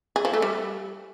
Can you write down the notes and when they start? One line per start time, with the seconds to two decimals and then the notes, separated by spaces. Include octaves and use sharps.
0.16 G#4
0.25 F3
0.34 A3
0.42 G3